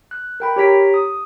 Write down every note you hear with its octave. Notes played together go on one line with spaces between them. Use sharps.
F#6
A#4 G5 B5
G4 C#5 A#5 B6 D7
D#6